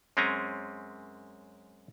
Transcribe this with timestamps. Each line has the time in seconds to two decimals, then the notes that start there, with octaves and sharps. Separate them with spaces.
0.17 F#2 G#3 C4 C#4 G#5 A#5